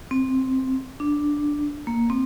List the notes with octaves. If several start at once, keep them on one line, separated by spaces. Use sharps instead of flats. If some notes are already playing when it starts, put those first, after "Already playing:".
C4
D4
A#3
C4